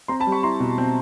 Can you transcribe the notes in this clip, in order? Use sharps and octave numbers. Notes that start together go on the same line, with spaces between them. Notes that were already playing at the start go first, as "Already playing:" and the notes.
C4 A#5 C6
A5 B5
G3
B5 C#6
E4 A#5 C6
B2
C4